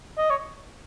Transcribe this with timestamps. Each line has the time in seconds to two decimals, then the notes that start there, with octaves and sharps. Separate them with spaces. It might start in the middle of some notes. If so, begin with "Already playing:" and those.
0.18 D#5
0.30 C#5